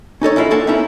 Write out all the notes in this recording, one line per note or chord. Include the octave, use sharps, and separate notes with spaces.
C#4 D#4 A4 C#5
E3 C#4 E4 F4
A#3 D4 A4 F#5 G#5
A3 B3 C#4 D#4 E4